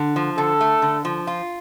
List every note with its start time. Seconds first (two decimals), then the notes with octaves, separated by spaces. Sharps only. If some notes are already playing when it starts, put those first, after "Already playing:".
Already playing: D3
0.16 F3
0.37 D3 A4
0.61 A3
0.82 D3
1.05 F3
1.27 F4